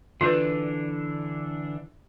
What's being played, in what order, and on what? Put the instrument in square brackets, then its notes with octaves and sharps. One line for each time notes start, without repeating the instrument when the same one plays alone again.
[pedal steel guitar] D3 E3 D4 [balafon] F4 B4